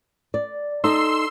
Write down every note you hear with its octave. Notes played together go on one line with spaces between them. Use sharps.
D5
D#4 A4 D#5 C6 E6